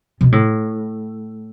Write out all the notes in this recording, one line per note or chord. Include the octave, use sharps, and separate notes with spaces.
B2
A2